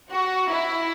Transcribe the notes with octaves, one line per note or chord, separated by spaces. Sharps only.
F#4
E4